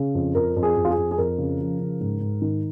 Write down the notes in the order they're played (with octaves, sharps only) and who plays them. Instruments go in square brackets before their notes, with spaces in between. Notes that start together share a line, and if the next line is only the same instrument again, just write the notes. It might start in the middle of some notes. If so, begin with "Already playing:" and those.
Already playing: [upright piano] C#3
F2
F2 A#4
F2
G#4
F2
F4
G#4
F2
G#4
F2 A#4
C#3
F3
C#3
G#2
G#2
D#3